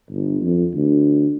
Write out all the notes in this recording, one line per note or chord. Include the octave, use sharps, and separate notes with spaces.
G1
F2
D2